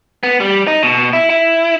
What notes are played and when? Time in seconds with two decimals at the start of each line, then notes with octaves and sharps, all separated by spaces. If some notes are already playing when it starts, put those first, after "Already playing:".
0.23 B3
0.40 G3
0.67 D#4
0.83 B2
1.13 E4
1.30 E4